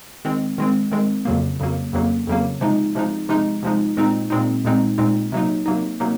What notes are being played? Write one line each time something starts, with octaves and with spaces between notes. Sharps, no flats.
D#3 G#3 C4
D#3 G#3 C4
D#3 G#3 C4
F2 C#3 F#3 A#3
F2 C#3 F#3 A#3
F2 C#3 F#3 A#3
F2 C#3 F#3 A#3
C3 F3 G#3 D#4
C3 F3 G#3 D#4
C3 F3 G#3 D#4
C3 F3 G#3 D#4
A#2 G#3 C4 D#4
A#2 G#3 C4 D#4
A#2 G#3 C4 D#4
A#2 G#3 C4 D#4
C3 F#3 A#3 D#4
C3 F#3 A#3 D#4
C3 F#3 A#3 D#4